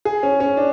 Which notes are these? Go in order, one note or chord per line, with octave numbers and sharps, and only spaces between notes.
G#4
C#4
C#4
D4